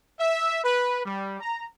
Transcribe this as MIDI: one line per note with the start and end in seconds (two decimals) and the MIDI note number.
0.19 0.61 76
0.63 1.03 71
1.04 1.40 55
1.40 1.65 82